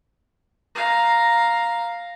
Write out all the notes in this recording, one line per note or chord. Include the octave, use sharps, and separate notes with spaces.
F5 A#5